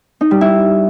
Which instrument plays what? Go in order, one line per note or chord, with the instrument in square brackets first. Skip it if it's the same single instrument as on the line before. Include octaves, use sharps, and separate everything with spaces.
[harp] D#4
G3
E4